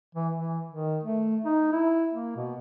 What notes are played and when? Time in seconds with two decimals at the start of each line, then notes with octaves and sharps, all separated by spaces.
0.15 E3
0.36 E3
0.72 D#3
1.03 A3
1.45 D#4
1.73 E4
2.13 A#3
2.36 B2